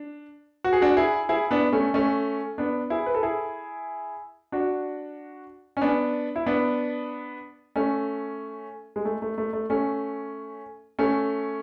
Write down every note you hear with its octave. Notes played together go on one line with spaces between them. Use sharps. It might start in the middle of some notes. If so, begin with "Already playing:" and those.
Already playing: D4
F#4
G#4
D4 F#4
E4 G#4
E4 G#4
B3 D4
A3 C#4
A3 C#4
B3 D4
E4 G#4
B4
A4
E4 G#4
D4 F#4
C#4
B3 D4
E4
B3 D4
A3 C#4
G#3
A3
A3
A3
A3
A3 C#4
A3 C#4